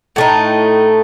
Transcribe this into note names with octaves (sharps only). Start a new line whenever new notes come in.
A2 A3 D#4